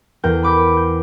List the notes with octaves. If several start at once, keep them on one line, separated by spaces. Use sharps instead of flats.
E2 A#4 G5 G6
B5 D6 G6 B6
G6